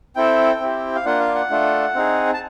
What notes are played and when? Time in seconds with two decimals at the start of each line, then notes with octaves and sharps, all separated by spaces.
0.16 C4 E4 A4 G5
0.60 C4 E4 G4
0.95 F5
1.06 A#3 D4 F4 F#5
1.20 F5
1.35 F#5
1.50 A3 D4 F4 A4
1.95 C4 D#4 G#4
2.34 A5